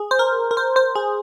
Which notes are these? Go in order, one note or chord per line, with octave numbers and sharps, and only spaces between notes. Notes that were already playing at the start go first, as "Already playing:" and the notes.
Already playing: G#4
C5
A#4
A#4
C5
C5
G#4